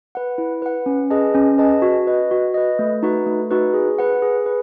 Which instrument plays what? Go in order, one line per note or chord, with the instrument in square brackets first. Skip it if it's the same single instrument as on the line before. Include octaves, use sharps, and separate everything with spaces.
[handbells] B4 F#5
E4
B4 F#5
C#4
G#4 B4 D#5 A5
C#4
G#4 B4 D#5 A5
F#4
B4 D#5
F#4
B4 D#5
A3
D#4 F#4 B4
A3
D#4 F#4 B4
G#4
B4 F#5
G#4
B4